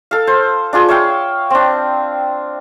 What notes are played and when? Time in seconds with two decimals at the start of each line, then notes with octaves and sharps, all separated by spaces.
0.11 A4 F5
0.27 C5
0.73 D4 F4 G#4 C6
0.88 C#5 E5 F5 G5
1.50 C4 D4